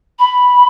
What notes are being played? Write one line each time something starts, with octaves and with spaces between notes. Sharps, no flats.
B5